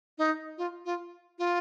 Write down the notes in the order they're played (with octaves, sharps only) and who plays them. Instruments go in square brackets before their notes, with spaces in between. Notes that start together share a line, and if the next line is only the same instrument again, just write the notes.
[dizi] D#4
F4
F4
F4